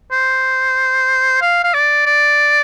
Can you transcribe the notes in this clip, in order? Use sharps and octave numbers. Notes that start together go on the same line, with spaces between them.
C5
F5
F5
D5
D5